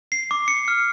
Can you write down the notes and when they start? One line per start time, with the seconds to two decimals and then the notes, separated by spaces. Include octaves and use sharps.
0.12 C7
0.31 D6
0.48 C#7
0.68 F6